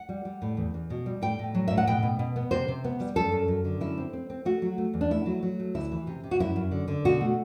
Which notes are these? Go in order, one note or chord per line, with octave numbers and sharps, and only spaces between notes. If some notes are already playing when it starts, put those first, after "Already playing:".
Already playing: F#5
G3
G3
A2
E2
E2
B2
G3
A2 G5
A2
F#3
A2 E5
F#5
B2 G5
B2
B2
B3
C3 C5
C3
B3
G3
F#2 A4
F#2
F#2
D3
F#2 E4
C4
C4
C4
A3 F#4
F#3
A3
E2
D4
A3 E4
F#3
F#3
A3
D2 E4
E3
C3
C3
F#4
F#2 E4
F#2
D3
D3
B2 F#4
A3